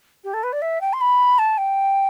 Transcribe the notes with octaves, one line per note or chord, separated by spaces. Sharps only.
G4
A4
B4
D5
E5
G5
C6
B5
A5
G5